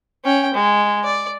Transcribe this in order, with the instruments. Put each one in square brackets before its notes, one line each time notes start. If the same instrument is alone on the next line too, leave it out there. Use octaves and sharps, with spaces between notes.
[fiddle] C#4 G5
G#3
D5